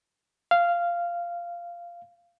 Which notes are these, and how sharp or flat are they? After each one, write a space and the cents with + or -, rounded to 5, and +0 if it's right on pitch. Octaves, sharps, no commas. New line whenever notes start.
F5 -10